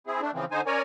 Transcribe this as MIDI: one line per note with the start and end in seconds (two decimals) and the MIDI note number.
0.07 0.21 60
0.07 0.21 64
0.07 0.21 68
0.22 0.31 57
0.22 0.31 62
0.34 0.45 49
0.34 0.45 52
0.34 0.45 53
0.34 0.45 60
0.52 0.61 50
0.52 0.61 63
0.52 0.61 72
0.52 0.61 80
0.66 0.82 61
0.66 0.82 70
0.66 0.82 73
0.66 0.82 74
0.66 0.82 80